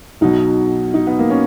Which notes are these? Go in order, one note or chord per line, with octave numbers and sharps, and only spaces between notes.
B1 B2 F#3 D#4
D#4
B3
A#3
C#4